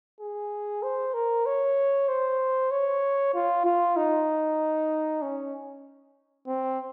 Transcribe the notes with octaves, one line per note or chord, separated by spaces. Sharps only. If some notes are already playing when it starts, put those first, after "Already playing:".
G#4
C5
A#4
C#5
C5
C#5
F4
F4
D#4
C#4
C4